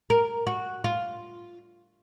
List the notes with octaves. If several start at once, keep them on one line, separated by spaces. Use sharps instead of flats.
A#4
F#4
F4